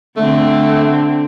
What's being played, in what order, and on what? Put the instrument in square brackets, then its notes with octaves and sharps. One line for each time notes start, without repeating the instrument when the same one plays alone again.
[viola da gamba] D3 C4 [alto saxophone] A3